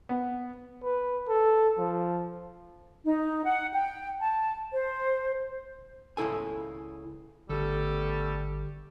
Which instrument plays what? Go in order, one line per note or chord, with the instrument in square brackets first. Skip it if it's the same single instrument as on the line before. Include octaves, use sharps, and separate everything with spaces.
[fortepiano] B3
[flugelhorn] B4
A4
F3
[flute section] D#4
F#5
G5
A5
C5
[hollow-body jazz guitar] C#2 C#3 E4 A4 G#5
[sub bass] G#1 [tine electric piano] D3 G4 [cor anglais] G3 [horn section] A3 B3 A4